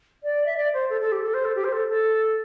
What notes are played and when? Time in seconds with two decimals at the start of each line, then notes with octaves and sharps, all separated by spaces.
0.23 D5
0.46 E5
0.56 D5
0.73 C5
0.89 A4
1.00 A4
1.12 G4
1.23 A4
1.34 C5
1.44 A4
1.55 G4
1.64 C5
1.72 A4
1.88 A4